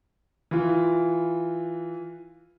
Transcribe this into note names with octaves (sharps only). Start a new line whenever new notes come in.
E3 F4